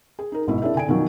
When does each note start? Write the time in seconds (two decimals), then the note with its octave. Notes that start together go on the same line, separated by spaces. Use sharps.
0.19 G#4
0.32 D#4 A#4
0.47 G#1 B2 E4
0.62 D4 E4 G#4 A#4 E5
0.75 D3 G#5 D7
0.88 B2 D#3 F3 F#3